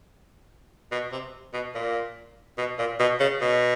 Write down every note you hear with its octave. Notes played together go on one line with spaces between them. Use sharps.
B2
C3
B2
A#2
B2
A#2
B2
C#3
B2